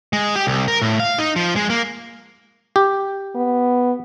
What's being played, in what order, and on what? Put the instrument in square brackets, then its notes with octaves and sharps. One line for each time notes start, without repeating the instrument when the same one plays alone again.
[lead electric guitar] G#3
G4
C2
A#4
A2
F5
D#4
F3
G#3
A#3
[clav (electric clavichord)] G4
[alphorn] B3